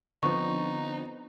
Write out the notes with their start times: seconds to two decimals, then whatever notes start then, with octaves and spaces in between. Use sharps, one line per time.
0.23 D3 F3 B3 C4 D#4 C#6